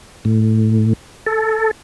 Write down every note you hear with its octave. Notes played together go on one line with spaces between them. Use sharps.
A2
A4